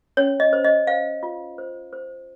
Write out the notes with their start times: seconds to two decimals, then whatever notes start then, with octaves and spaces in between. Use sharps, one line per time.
0.17 C#4 C#5
0.40 D#5
0.53 C5
0.64 D#5
0.87 C5 F5
1.23 F4
1.58 C5
1.93 C5